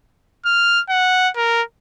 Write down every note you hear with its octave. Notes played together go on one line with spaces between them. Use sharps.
F6
F#5
A#4